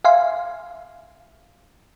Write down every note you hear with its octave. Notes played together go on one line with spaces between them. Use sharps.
E5 F5 G#5 C6